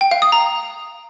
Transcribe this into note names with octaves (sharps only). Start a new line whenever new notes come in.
G5
F5
D#6
A#5